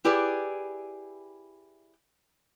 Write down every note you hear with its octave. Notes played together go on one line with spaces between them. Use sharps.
E4 G4 G#4 B4 D5